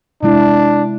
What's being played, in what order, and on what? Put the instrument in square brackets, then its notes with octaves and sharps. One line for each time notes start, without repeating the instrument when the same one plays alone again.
[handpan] C3 G#3 E4 [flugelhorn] D4